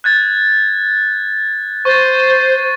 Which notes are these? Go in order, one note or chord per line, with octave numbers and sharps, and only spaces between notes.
F#6 G#6 A6
C5 C#6 A6